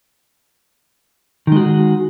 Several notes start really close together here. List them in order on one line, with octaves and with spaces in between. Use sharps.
D#3 G#3 F#4 G#4